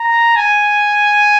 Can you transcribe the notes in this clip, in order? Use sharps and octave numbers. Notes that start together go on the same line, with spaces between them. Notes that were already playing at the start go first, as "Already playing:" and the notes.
Already playing: A#5
G#5